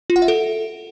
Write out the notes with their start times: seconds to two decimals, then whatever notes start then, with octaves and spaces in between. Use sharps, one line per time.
0.10 F4
0.16 F#5
0.22 E5
0.28 A4